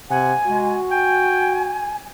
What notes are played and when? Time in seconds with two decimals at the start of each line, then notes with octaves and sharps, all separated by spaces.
0.10 C3 F#5 G#5
0.47 G#3 F#4
0.91 G5 G#5